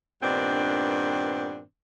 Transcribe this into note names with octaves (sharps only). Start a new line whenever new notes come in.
G2 A#2 D#3 B3 C4 D4